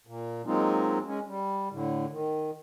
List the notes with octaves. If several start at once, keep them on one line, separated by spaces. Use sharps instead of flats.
A#2
F#3 G#3 A#3 C4 D#4 F4
G#3 C#4
G3
A2 D3
D#3